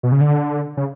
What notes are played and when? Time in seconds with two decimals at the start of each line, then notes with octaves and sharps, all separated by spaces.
0.03 B2
0.12 C#3
0.21 D3
0.77 C#3